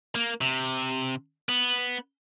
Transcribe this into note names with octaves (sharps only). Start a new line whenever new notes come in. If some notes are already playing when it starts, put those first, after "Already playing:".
A#3
C3
B3